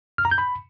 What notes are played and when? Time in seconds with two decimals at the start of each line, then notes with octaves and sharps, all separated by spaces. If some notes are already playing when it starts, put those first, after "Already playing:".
0.18 F6
0.25 A#5
0.31 G6
0.38 B5